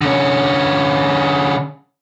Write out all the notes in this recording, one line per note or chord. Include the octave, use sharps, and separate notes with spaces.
D3 C#4